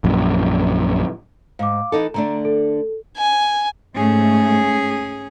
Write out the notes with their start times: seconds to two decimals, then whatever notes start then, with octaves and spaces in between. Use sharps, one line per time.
0.04 A#1 F#2
1.59 G#2 F5 D6
1.92 E3 D#4 A4
2.14 D3 A3 D4 A#5
2.45 A4
3.17 G#5
3.95 G#2 A3 C#4 G#4